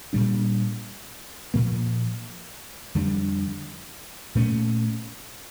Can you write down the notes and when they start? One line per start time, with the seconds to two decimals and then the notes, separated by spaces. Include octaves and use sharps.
0.13 A#2 G3 D4
1.54 A#2 F3 A#3
2.95 F2 D3 G3 D4
4.35 A#2 A3 C#4